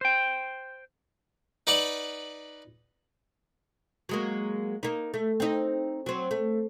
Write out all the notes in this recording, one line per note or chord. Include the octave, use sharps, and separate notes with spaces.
C5 G5
D#4 B4 D5 F#5 B5
F#3 G#3 A#3
A#3 D#4
A3
C4 D#4
F#3 C4
A3